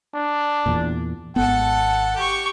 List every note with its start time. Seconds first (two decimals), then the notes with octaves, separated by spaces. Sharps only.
0.14 D4
0.66 E2 A#2
1.36 G#1 B3 A4 F#5 A5
2.16 G4 C#6